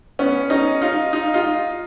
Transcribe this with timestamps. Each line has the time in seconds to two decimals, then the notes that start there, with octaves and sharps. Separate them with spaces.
0.19 B3 C#4
0.50 C#4 D#4
0.82 D#4 F4
1.13 D#4 F4
1.34 D#4 F4